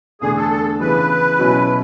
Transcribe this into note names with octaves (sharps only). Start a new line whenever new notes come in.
E2 D3 A3 D4 G#4
A4
A4
C#3 E3 B3 B4
B2 F#3 C#4 E4